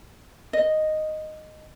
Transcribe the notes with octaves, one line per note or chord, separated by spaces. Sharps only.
D#5